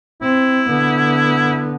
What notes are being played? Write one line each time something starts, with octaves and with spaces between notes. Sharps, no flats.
C4 E4
D3 B3